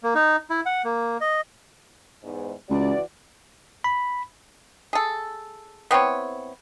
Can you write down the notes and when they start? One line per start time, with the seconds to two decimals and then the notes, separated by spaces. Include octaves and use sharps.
0.03 A#3
0.15 D#4
0.50 E4
0.66 F#5
0.84 A#3
1.21 D#5
2.23 E2 G#2
2.70 C#2 E3 F#4 D5
3.84 B5
4.93 G#4 A4
5.91 B3 C4 E4 C#5